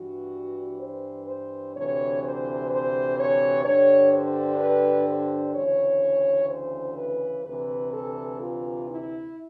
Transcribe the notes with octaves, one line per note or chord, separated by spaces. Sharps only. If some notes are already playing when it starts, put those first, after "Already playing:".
Already playing: G2 E3 F#4
C5
C5
D2 C3 E3 C#5
C5
C5
C#5
G2 D3 C#5
C5
B4
C5
D2 C#3 E3 C#5
C5
B4
D2 C3 E3 B4
A4
F4
E4